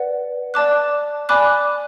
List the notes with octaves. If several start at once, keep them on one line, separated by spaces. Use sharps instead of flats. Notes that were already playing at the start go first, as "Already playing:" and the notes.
Already playing: B4 D5 F#5
D5 A5 D6 F#6
D5 G#5 B5 D6 F#6